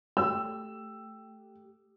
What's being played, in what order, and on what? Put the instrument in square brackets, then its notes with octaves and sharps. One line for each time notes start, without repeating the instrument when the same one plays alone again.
[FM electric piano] A3 G4 [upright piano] E6